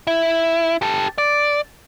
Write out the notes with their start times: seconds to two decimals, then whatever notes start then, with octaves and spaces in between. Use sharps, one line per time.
0.07 E4
0.82 G4 A4
1.18 D5